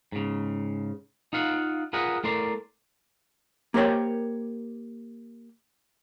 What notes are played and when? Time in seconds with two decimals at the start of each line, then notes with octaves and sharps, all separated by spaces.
0.12 G#2 C#3
1.33 D#4 F4 F5 F#5
1.93 F4 G#4 A#4 B4 D#5 F#5
2.24 A3 E4 A#4 D5 C6
3.74 A#3 G4 A#4 C5 C#5 G5